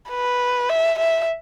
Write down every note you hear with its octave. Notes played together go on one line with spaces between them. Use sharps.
B4
E5
E5